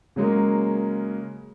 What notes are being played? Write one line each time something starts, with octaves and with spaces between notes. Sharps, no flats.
C#3 F#3 G#3 A#3